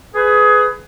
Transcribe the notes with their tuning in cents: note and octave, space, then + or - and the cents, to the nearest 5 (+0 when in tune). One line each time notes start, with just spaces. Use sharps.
G#4 +20 B4 +20